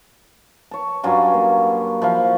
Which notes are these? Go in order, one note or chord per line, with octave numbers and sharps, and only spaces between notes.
C#5 A5
G2 F#3 C#4 F4
A#3
F3 E4 F5